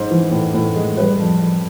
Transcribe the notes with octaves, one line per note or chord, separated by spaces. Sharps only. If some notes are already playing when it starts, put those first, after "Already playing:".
Already playing: G#2 C5
E3
A2
A2
G#3
G3 B4
F2
F2